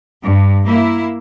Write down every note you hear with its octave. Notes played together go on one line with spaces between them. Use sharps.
G2
A#3 E4